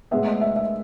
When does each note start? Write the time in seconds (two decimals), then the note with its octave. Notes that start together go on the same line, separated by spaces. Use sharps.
0.11 A2 G#3 B3 E5
0.26 D#5
0.41 E5
0.56 E5